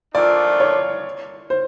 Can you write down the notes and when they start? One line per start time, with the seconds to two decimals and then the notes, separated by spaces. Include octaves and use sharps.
0.14 A#2 F3 A3 D4 F4 D5
0.60 C#5
1.50 C5